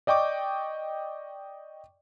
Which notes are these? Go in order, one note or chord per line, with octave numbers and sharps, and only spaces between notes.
D5 D#5 G5 C#6 D6